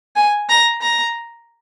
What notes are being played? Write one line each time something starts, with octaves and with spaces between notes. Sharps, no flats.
G#5
A#5
A#5